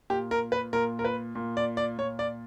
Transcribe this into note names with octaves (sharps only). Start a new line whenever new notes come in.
A#2 G4
A#4
B4
A#2 A#4
A#4
B4
A#2
D5
D5
A#2 C#5
D5